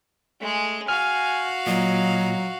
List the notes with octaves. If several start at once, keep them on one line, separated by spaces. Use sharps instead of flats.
G#3 A3 G#4
F#4 F5 G#5 F6
A#2 F#3 D#5